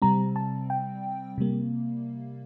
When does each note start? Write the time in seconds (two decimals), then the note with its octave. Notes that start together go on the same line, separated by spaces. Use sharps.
0.02 C3 G3 C4 A#5
0.36 A5
0.70 G5
1.38 C3 G3 A#3